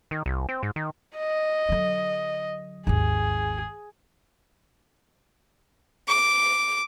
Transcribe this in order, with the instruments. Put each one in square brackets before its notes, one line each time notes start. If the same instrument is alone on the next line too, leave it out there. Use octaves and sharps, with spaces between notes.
[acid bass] D#3
C2
C4
G#2
D#3
[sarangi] D#5
[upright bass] D3 F#3
[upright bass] G#1 D#2 [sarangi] G#4
[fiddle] D6